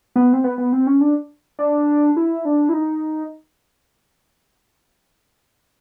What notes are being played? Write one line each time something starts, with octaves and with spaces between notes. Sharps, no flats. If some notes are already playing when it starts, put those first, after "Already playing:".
B3
C4
B3
B3
C4
C#4
D4
D4
E4
D4
E4
D#4